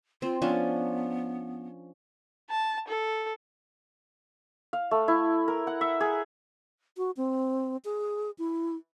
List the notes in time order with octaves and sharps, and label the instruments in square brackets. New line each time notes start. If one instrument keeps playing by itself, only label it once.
[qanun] C4 [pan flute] F4
[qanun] F3 C#4 D4 [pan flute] B3
[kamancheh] A5
A4
[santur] F5
A3
E4
A#4
F#5
E5
G#4
[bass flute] F#4
C4
G#4
E4